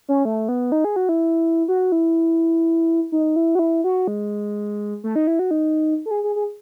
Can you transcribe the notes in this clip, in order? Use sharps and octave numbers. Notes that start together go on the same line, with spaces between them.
C#4
A3
B3
D#4
G#4
F#4
E4
F#4
E4
D#4
E4
F#4
E4
F#4
G#3
A3
D#4
E4
F#4
D#4
A4
G#4
G#4
G#4